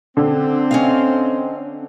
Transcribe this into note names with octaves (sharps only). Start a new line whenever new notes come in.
D3 C4
C#4 D#5 F5